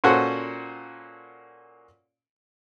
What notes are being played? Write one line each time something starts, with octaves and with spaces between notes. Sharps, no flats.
A#2 C#4 F#4 A4 C5 F#5